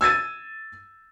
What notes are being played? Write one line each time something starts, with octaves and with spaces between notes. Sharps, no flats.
E6 G#6 A6 D#7